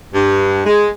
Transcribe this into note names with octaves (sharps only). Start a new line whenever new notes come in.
G2
G#3